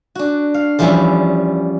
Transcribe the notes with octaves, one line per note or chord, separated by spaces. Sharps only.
D4 F#4
F5
E2 F3 G3 B3 C#4 E5